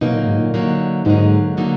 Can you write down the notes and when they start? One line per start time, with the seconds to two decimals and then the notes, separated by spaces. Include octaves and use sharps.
0.01 B2 D3 F#3 A#3 D#4
0.14 A#2
0.26 G#2
0.39 A#2
0.54 D3 F#3 A#3 D#4
1.05 G#2 D3 F#3 A#3 D#4
1.57 D3 F#3 A#3 D#4